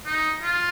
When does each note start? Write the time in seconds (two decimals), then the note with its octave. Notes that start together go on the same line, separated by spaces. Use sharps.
0.06 D#4
0.42 F4